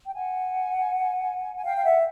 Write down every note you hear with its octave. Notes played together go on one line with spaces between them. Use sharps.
G5
F#5 G#5
G#5
F5 G5
F5
E5 F#5